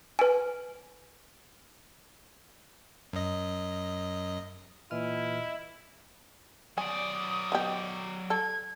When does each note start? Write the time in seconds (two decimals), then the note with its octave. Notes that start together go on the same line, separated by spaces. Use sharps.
0.19 B4 G#5
3.13 F#2 D#5
4.91 A#2 E3 E4 D#5 F6
6.78 F#3 D5 G#5 D#6
7.52 D#3 B3 G4
8.30 A4 G#6